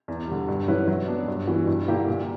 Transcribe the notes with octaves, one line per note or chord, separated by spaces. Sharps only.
E2
D3 G3
G2
F#3 C#4 E4 B4
F#3
B3 D4
G2
E3 B3 F#4
G2
D3 A#3 E4 G4
A#2